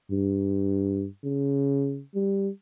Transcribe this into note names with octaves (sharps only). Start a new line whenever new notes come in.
G2
C#3
G3